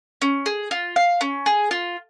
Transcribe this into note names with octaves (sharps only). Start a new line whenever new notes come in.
C#4
G#4
F4
F5
C#4
G#4
F4